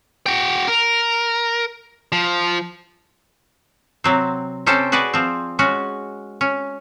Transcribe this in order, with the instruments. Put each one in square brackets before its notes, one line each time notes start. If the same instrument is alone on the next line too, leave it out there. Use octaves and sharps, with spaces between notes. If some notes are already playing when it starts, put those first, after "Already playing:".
[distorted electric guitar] F#4 G5
A#4
F3
[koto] C3 F#3 C4
C3 C#4 A4 C5 G5
F#4 G#4 B4 D5
F3 C4
G#3 C#4 F#4
C#4